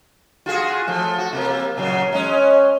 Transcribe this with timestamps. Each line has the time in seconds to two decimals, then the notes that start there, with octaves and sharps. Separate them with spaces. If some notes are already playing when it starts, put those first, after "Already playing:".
0.46 F4 F#4 G#4
0.87 F3 A3
1.18 F#4
1.33 C3 A#3
1.77 A#2 C#3 F#3
2.13 G#3 C#4